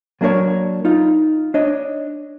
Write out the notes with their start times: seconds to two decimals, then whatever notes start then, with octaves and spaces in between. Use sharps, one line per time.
0.21 F#3 A#3 D4 A#4 C#5
0.85 D#4 F4
1.54 D4 C#5 D#5